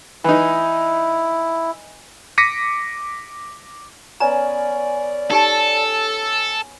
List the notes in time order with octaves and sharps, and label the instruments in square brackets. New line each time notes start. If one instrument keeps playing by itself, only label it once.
[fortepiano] E3 D#4 [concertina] E4
[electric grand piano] D6 A#6 B6 C#7 D#7
[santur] B3 C#4 G#5 [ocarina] D5 [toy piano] A#5
[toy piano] D#4 G4 A5 [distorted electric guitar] A4